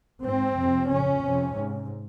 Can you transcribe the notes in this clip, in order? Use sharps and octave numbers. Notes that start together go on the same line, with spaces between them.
G#2 C4
F2 C3
F2 C#3 C#4
F2 C3
G#2